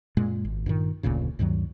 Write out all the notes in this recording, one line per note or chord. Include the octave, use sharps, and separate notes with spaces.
F#2 A#2 G#3
G#1
G2 A#2 D#3
F1 D2 A#2 C#3
D2 G2 D#3 F#3